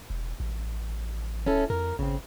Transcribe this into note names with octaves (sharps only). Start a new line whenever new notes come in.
E1
A1
D1 C#4 E4 A4
F2 A#4
G#1 C#3 C4